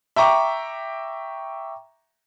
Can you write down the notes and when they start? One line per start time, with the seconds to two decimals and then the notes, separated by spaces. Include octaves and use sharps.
0.16 E5 G5 A#5 C#6 D6